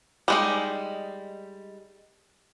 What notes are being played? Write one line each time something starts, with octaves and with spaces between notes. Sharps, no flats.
G3 G#3 D#4